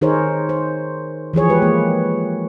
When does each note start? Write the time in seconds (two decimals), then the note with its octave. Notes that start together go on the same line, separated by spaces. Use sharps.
0.01 D#3 D#4 G#4 A#4 C5 C#5
0.49 C5
1.33 E3 F3 G#4 C#5
1.49 G#3 G4 B4
1.62 A#3